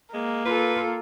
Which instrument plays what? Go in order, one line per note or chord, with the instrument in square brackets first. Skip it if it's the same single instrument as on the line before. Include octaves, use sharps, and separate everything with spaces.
[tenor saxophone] G#3 [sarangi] A#3
[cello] F4 A4 [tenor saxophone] B4